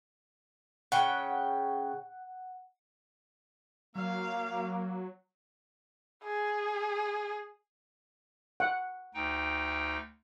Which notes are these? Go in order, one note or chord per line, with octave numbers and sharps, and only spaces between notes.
C#3 C#5 F#5 G5
F#3 A#3 F5
G#4
F#5
D2 D#4 G5